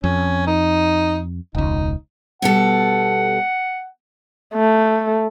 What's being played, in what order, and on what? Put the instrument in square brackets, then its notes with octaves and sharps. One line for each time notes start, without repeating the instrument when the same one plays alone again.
[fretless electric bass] F2 [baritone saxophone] C#4
[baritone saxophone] D#4
[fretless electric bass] E1 C#2 [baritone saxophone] D#4
[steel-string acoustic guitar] B2 G3 A4 [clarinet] F#5
[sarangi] A3